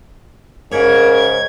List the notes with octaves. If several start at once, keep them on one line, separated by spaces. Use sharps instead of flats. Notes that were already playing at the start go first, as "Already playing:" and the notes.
G#2 C#3 A#4 G#6